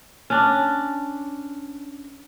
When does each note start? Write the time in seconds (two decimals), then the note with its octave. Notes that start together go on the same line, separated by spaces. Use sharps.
0.30 C#4 D4